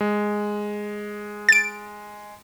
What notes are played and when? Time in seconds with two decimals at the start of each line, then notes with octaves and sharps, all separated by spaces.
0.01 G#3
1.49 A6 D7